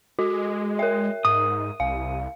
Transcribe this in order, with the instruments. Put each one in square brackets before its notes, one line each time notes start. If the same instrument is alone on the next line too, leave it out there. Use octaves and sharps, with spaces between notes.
[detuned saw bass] G#3 [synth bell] F#4
[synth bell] A#4 E5
[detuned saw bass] G#2 [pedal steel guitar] D#6
[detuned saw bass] C2 [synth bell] F5